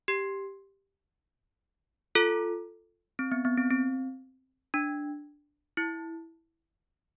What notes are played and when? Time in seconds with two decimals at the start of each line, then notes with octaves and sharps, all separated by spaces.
0.08 G4
2.15 F4 A4
3.19 C4
3.32 B3
3.45 B3
3.58 C4
3.71 C4
4.74 D4
5.77 E4